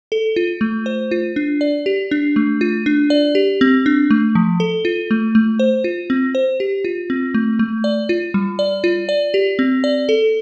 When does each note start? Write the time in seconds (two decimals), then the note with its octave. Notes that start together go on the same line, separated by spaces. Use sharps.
0.12 A4
0.36 F4
0.61 A3
0.86 C5
1.11 F4
1.36 D4
1.61 D5
1.86 G4
2.11 D4
2.36 A3
2.61 F4
2.86 D4
3.10 D5
3.35 G4
3.61 C4
3.86 D4
4.10 A3
4.35 F3
4.60 A4
4.85 F4
5.11 A3
5.35 A3
5.59 C5
5.84 F4
6.10 C4
6.35 C5
6.60 G4
6.85 F4
7.10 C4
7.34 A3
7.59 A3
7.84 D5
8.09 F4
8.34 G3
8.59 D5
8.84 F4
9.09 D5
9.34 G4
9.59 C4
9.84 D5
10.09 A4